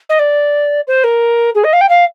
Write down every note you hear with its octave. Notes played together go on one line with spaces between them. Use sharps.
D#5
D5
C5
A#4
G#4
D#5
F5
G5
F5